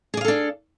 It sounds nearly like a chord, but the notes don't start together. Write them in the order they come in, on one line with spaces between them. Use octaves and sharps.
G#4 D5 F5 A4 D4